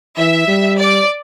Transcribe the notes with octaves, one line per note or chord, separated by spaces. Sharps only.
E3 E5
G3
D5